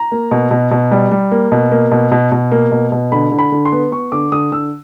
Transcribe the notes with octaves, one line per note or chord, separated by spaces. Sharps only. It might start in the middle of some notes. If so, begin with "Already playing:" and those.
Already playing: A#5
A#3
B2
B2
B2
G3
G3
A#3
B2
A#3
B2
B2
B2
A#3
B2
B2
D3 B5
D3
B5
D3
C6
B3
B3 C#6
D3 D6
D3 D#6
D3 E6